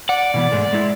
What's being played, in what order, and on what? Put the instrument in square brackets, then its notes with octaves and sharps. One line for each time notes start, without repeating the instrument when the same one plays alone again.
[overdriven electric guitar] D5 [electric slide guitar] F#5
[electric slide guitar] B2 E3 B3
G#2 G#3 A3
G#3 E4